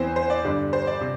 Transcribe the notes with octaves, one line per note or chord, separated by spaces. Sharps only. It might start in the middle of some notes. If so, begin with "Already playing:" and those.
Already playing: E2 E3 C4 C5
C5
D5
G2 D3 G3 D5
C5
D5
C3